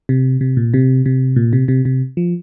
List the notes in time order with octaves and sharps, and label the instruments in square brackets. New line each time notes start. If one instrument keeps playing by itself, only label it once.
[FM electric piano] C3
C3
A#2
C3
C3
A#2
C3
C3
C3
F3